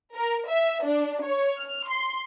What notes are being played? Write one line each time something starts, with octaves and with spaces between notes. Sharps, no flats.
A#4
E5
D4
C#5
F6
C6